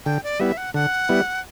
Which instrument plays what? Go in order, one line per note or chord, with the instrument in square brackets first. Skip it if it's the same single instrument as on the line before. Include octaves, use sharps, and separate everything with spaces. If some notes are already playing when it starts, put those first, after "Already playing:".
[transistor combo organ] D3 [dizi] G5
[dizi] D5
[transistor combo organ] G3 B3 E4 [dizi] E5
[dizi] F#5
[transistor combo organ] D3 [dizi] F#5
[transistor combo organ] G3 B3 E4